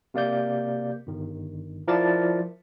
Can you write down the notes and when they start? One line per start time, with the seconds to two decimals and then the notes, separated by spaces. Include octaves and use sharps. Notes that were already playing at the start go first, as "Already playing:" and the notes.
0.14 C3 A#3 D5 G6
1.07 G1 D#3
1.88 F3 E4 A#4 D5 A5 A6